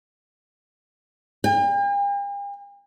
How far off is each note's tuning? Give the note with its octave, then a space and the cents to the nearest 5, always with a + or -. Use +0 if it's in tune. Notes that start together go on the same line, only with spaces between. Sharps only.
G5 +45